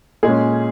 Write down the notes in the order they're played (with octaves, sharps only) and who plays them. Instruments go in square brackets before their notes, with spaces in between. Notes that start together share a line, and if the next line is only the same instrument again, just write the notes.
[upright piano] A#2 G#3 C#4 G#4